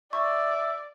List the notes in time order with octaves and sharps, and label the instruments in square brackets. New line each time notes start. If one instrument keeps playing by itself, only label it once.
[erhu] D5 [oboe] E5 [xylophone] C#6